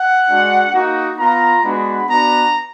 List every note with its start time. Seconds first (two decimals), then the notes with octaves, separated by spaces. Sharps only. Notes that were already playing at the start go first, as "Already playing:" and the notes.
Already playing: F#5
0.28 G#3 D4 F#4
0.72 A#3 D#4 F#4
1.18 B3 F4 A#5
1.63 G#3 B3 D4 F#4 B5
2.08 B3 D4 F#4 A#5